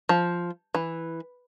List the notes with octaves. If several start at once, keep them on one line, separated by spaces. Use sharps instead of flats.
F3
E3